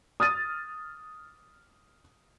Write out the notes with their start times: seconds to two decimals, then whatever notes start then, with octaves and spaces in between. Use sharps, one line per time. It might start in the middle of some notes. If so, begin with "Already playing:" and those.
0.20 D#6 F6 A6 D#7